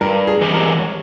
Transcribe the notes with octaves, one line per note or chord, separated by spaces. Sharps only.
G2 A#4
G#4
E3 G#3 C4 G4
A#4
C#5